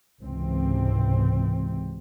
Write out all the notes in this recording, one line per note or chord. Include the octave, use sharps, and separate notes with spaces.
C#2 G#2 C3 E3 C4